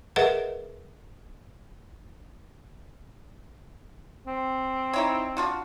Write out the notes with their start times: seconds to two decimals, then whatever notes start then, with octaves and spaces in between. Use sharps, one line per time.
0.16 G#4 A#4 B4 D#5 E5 F#5
4.27 C4
4.93 D#4 E4 C#5
5.37 D4 F4 F#4